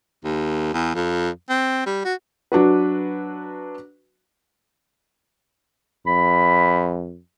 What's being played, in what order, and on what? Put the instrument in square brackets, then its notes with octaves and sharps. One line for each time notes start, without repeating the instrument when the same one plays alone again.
[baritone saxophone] D#2
E2
F2
C4
G3
F#4
[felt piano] F#3 D4 F#4 B4
[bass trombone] F2 [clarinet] B5